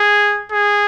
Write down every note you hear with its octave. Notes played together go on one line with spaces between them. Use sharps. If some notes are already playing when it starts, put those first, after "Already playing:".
Already playing: G#4
G#4